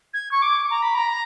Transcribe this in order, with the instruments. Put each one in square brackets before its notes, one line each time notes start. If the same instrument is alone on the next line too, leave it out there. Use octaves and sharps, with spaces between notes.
[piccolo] G#6
C#6
D6
A#5
B5
A#5